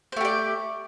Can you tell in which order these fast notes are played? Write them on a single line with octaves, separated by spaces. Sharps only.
C5 A3 G4 D5